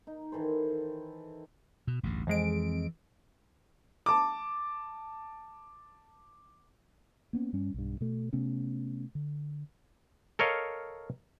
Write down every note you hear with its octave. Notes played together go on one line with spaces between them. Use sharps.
D#4
D#3 E3 A4 C5
B2
A1 D2 G2
F2 E3 G#3 D7
A5 D6
A#3 B3 C#4
G2 G3 C#4
B1 G2
B2 A3
C3 A3 B3 C#4
D3
A4 A#4 C#5 D#5 F5